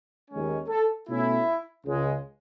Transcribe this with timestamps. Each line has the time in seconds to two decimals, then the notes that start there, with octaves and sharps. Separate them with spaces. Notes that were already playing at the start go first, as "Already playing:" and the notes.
0.31 D#2 D#3 G#3 C#4
0.69 A4
1.08 B2 A3 C#4 E4
1.85 C#2 C#3 G#3